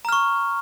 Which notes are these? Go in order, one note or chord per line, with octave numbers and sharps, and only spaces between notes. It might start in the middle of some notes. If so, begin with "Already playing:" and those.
A#5 C#6 F6